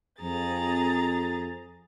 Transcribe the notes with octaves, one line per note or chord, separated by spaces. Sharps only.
F2 G#4 A#5 A6